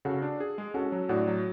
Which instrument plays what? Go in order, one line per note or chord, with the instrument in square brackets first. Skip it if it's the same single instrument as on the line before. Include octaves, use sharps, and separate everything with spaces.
[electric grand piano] C#3 [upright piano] F#4 A4
[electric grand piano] D4
G#4
G#3
[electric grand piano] C#4 [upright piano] F#4 A4
[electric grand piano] F#3
[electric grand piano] A2 [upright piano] D4 F#4
[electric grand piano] F#3